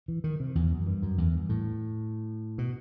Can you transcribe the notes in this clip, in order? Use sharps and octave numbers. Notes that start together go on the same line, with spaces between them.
E3
D#3
C3
E2
F#2
G2
F#2
E2
G2
A2
B2